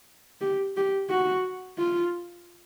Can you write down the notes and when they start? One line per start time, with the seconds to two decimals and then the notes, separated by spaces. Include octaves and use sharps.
0.41 G4
0.77 G4
1.10 F#4
1.79 F4